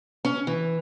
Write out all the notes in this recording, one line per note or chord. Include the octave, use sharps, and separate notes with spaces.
C#4
E3